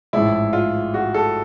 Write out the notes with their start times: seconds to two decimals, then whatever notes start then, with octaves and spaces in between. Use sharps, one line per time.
0.13 A1 G#2 F3 E4
0.53 F4
0.94 F#4
1.14 A4